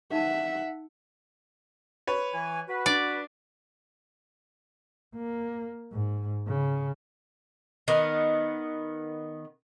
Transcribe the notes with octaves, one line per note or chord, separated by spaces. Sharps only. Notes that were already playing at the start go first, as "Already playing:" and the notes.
D#4 E5 F#5 A5
B4 C#5
E3 G#5
F#4 B4
D4 D5
A#3
G#2
C#3
D#3 B3